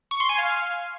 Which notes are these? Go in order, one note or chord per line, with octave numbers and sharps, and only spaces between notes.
C#6
C6
G#5
F5